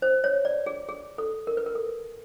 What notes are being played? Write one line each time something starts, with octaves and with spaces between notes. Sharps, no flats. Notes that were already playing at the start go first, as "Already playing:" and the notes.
C5
C#5
D5
G#4
G#4
A4
A#4
B4
A#4
A4